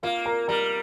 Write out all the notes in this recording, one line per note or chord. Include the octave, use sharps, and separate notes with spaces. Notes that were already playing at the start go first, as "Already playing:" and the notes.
A#3 F4 F5
A#4 A#5
G3 A#4 A#5